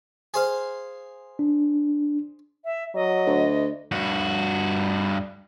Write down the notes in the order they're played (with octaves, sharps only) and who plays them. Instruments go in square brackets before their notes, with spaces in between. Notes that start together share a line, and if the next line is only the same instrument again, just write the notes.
[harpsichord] G#4 C5 F5
[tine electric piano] D4
[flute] E5
[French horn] F#3 [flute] D#5
[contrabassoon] D2
[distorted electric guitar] G2 F#4